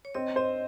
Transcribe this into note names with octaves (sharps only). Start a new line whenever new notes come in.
C#5
C4 D#5
C5 D#5